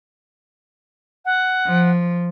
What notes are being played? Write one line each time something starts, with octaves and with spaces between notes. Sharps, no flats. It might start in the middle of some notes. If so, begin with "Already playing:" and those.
F#5
F3